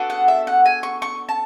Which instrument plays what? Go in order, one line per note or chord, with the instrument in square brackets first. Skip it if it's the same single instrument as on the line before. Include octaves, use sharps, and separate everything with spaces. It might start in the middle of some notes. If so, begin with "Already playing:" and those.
Already playing: [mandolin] B3 D4 F#4 A4
F#5
E5
F#5
G#5
C#6
C#6
A5